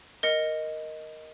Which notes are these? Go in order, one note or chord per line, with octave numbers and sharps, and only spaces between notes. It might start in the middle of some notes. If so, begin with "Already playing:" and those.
A#4 D#5 C#7